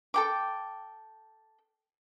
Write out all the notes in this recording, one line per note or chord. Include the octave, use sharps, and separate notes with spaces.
A4 G5 D6